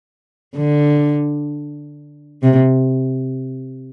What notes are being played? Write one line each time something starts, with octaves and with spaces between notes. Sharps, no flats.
D3
C3